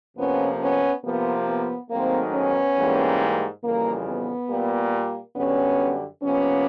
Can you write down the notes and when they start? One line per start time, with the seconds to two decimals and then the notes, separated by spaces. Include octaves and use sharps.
0.17 F2 C3 F3 A#3 B3 C#4
0.60 B3 C#4
1.03 C3 F3 A#3 B3
1.48 B3
1.90 G#2 D#3 F#3 A3 A#3 C4
2.33 B3 C#4
2.77 G#2 E3 G3 A#3
3.63 F2 C#3 E3 G3 A#3
4.07 B3
4.49 A#2 G3 A#3
5.36 F#2 D3 G3 B3 C#4
6.22 C3 F3 A#3 B3 C#4